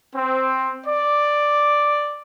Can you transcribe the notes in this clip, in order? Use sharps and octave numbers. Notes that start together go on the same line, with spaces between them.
C4
D5